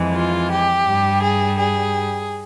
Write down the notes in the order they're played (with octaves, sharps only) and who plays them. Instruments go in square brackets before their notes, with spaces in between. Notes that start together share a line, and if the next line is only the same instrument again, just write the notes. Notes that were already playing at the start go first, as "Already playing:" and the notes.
Already playing: [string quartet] F2 E3 G#3
F4
G4
G2 G3
G#4
G#4